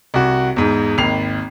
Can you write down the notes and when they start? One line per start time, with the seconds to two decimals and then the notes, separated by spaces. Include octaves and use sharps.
0.14 C2 F#4
0.56 E2 G#2
0.98 G#1 D#2 C7 F7